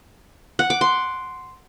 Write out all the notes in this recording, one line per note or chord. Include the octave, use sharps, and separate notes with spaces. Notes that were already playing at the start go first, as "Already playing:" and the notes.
F#5
D6
C6